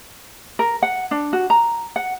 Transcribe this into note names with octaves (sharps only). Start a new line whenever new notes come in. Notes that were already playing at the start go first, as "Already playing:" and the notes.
A#4
F#5
D4
F#4
A#5
F#5